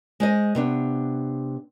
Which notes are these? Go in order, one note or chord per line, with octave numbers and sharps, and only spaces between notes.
G#3 C5 D#5
C3 B3 D4